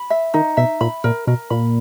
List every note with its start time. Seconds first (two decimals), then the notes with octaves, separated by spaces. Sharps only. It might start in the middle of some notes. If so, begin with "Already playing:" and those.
Already playing: B5
0.10 E5
0.34 D#3 D#4
0.57 B2 E5
0.81 A#2 B5
1.04 A#2 A#4
1.27 B2 A#4
1.50 A#2 B5